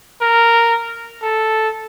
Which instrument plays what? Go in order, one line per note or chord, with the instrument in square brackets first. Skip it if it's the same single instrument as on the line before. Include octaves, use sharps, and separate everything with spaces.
[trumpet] A#4
A4